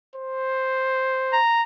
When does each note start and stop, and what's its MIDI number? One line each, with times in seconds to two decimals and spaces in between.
0.16 1.39 72
1.33 1.62 82